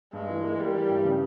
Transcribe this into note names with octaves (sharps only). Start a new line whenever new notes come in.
G2 G#3
E3
A#3
G3 A#3
E3
G2
C#3